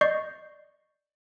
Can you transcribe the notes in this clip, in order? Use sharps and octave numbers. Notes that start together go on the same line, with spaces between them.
D5 D#5 C#6 G6 C7